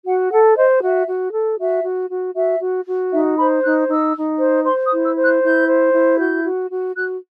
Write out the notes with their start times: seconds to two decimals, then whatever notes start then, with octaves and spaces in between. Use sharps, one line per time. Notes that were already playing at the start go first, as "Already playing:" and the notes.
0.05 F#4 F#5
0.30 A4 F#5
0.56 C5 D#5
0.82 F#4 E5
1.07 F#4
1.33 A4
1.59 F#4 E5
1.84 F#4
2.09 F#4
2.35 F#4 E5
2.61 F#4
2.86 F#4
3.11 D#4 E5
3.37 C5 B5
3.63 D#4 F#6
3.88 D#4 E6
4.15 D#4
4.39 C5
4.65 C5 C6
4.84 D#6
4.92 E4
5.03 E6
5.16 C5
5.23 F#6
5.42 E4 G6
5.68 C5
5.93 E4
6.18 F#4 G6
6.44 F#4
6.70 F#4
6.95 F#4 F#6